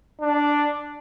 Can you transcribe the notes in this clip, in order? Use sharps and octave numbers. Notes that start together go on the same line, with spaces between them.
D4